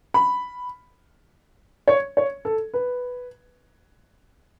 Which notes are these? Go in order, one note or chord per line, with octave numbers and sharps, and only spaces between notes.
B5
C#5
C#5
A4
B4